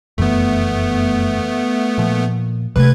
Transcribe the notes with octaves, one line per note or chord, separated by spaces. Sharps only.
F1 F#2 E3 A3 B3
A#2 F3
C3 A3 B4 G#6